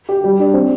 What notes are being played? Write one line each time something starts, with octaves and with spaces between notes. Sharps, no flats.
G4
G3
D4
C4